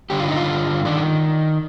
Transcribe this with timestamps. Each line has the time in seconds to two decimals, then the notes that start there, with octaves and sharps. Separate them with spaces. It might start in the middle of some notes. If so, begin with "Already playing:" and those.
0.10 G2 D3 G4
0.20 F4
0.28 D#4
0.36 F4
0.85 D#3 D4